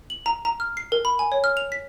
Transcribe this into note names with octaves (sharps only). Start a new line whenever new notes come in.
F#7
A#5
A#5
F6
C7
A#4
B5
G#5
C#5
F6
F7
B6